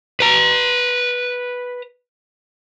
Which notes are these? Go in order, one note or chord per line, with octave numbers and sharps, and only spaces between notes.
B4 A#5